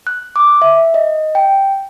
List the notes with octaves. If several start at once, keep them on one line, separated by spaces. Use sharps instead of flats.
F#6
D6
E5
D#5
G5